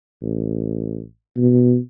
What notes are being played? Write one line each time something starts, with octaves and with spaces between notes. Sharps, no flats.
A1
B2